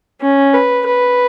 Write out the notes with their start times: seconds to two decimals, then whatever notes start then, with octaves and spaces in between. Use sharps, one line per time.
0.21 C#4
0.53 B4
0.86 B4